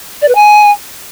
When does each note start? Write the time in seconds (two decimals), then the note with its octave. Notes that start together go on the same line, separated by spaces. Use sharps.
0.22 D5
0.28 B4
0.35 G#5